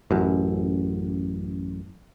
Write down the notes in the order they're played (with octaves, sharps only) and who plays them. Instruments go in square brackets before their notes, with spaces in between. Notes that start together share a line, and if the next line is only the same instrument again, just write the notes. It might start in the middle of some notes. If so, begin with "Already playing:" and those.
[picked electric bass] A1 F#2